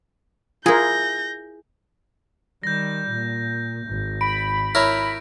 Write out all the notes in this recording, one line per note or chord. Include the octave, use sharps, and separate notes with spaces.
E4 F4 G#4 A#4 G6 A#6
D#3 G3 G6 A#6
A#2
G#1
B5 D7
E4 A#4 C#5